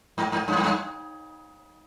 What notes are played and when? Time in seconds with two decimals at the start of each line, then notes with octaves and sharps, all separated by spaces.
0.18 G#2
0.32 G#2
0.48 G2
0.56 G#2
0.64 G2